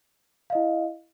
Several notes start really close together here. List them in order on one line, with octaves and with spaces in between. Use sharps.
F5 D#5 E4